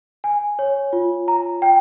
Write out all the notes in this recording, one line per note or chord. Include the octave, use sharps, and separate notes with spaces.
G#5
C#5
F4
A#5
G5